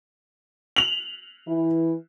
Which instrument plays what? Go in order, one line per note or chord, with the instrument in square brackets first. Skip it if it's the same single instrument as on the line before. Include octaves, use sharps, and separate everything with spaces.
[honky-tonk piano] F7 F#7
[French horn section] E3 E4